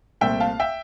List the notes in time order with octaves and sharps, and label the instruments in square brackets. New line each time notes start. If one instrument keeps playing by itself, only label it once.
[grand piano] C2 A#2 A3 C4 E5 G5
F5 A5
E5 G5